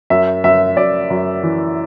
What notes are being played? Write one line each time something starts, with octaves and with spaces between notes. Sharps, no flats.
F#2 E5
F#2 E5
F#2 D5
F#2
E3